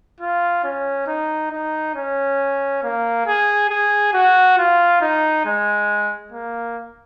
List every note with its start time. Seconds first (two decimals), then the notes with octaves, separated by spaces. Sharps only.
0.20 F4
0.64 C#4
1.07 D#4
1.51 D#4
1.95 C#4
2.83 A#3
3.26 G#4
3.70 G#4
4.14 F#4
4.58 F4
5.01 D#4
5.46 G#3
6.32 A#3